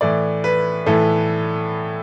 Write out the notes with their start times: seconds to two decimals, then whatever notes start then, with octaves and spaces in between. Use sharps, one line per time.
0.01 A2 E3 D5
0.44 B4
0.86 A2 E3 A4